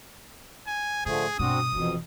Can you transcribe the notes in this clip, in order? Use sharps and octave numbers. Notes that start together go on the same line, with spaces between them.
G#5
A2 D3 F3 A3 G#4
G2 B2 C4 D4 F#4 D#6
F1 F2 B2 E3